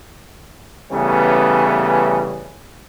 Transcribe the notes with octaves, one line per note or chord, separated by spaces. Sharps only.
C#3 E3 G3 A3 B3 C#4